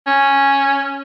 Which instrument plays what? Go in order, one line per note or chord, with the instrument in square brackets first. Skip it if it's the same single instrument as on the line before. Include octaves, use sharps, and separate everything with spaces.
[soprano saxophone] C#4